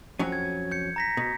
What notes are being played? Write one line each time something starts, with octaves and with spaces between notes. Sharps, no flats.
F2 F#3 C#4
G#6
G6 C#7
A#5 A#6 B6
B2